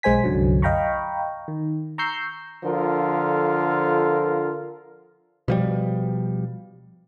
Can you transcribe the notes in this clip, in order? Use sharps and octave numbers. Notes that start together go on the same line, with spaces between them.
B1 G#3 C5 G#5 B6
C2 F#2 D3 F#3
D#5 F5 G5 A#5 B5 C#6
D#3
A#5 C#6 E6 G6 C7
D3 F3 F4 A4 A#4
B2 F3 G3